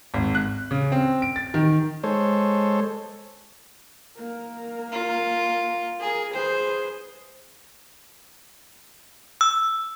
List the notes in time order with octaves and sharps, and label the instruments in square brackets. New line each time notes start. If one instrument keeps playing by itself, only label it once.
[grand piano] G#1
F#6
C#3
C4
D7
A6
D#3
[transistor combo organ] G#3 A4 C5 C#5
[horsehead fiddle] A#3 A#4
[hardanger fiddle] F4
[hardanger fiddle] G#4 [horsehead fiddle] A#4
[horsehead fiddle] G#4 B4 [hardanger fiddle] C5
[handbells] E6